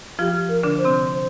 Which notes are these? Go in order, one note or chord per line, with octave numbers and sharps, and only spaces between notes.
F3 F4 G4
A#4
D3 D4
C5
C3 C4